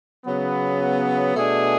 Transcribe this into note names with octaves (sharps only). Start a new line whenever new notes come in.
C#3 F#3 B3
B2 A3 D4 G#4